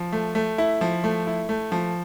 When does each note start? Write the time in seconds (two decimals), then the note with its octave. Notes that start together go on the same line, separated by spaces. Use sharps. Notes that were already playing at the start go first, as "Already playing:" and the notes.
Already playing: F3
0.12 A3
0.35 A3
0.58 E4
0.81 F3
1.04 A3
1.27 E4
1.49 A3
1.72 F3